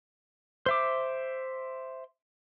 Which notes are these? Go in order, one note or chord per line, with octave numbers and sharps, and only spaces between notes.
C5 E5 D6